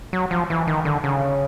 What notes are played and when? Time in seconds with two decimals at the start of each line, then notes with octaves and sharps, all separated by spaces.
0.13 F#3
0.31 F3
0.50 E3
0.67 D#3
0.85 D3
1.04 C#3